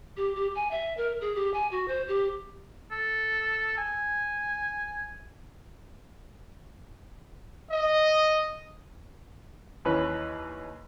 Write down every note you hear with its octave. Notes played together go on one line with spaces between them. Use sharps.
G4
G4
G#5
E5
A#4
G#4
G4
G#5
F#4
C5
G4
A4
G#5
D#5
D#2 E3 C#4 B4